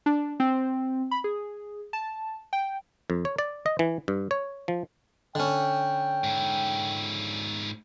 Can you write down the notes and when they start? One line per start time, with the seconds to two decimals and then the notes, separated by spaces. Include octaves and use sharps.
0.06 D4
0.40 C4
1.11 B5
1.24 G#4
1.93 A5
2.53 G5
3.10 F2
3.25 C#5
3.38 D5
3.66 D#5
3.79 E3
4.08 G2
4.31 C#5
4.68 F3
5.35 D3 C#4 G5
6.24 G#2 E4